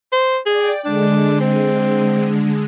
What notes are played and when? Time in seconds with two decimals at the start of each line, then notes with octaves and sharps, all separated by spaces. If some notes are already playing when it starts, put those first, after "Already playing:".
0.12 C5
0.46 G#4 D5 G5
0.85 D3 G#3 D4
1.41 C4